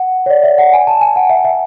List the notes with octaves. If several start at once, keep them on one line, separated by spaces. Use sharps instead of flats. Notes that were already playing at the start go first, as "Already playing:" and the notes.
Already playing: F#5
C#5
D5
E5
F#5
G#5
A5
G#5
F#5
E5
E5